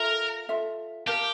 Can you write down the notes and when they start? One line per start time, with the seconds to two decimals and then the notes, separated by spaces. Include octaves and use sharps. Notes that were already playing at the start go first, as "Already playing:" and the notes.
Already playing: F4 A4 A#4 E5
0.49 F4 A4 E5
1.07 G4 A#4 F5 A5